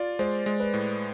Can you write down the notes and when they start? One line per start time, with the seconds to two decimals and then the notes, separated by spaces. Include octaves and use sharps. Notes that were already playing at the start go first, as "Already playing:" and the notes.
Already playing: F4 D5
0.19 G#3 C5
0.46 G#3
0.60 B4
0.74 A2